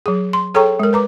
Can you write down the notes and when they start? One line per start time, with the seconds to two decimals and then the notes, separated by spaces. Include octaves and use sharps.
0.06 F#3 G#4
0.33 C6
0.54 G#4 A4 C#5 G5 A#5 C#6
0.79 G#3 A#4
0.93 B4 A#5 D6